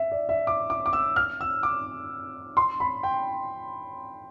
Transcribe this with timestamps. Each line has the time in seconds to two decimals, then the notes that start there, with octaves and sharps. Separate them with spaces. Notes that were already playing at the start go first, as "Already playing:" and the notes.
Already playing: E5
0.12 D5
0.29 E5
0.47 D6
0.70 D6
0.86 D6
0.93 E6
1.16 F6
1.41 E6
1.63 D6
2.57 C6
2.80 B5
3.03 G5